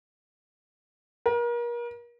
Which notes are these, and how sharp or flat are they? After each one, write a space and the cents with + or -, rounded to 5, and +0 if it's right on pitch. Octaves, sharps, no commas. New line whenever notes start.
A#4 +35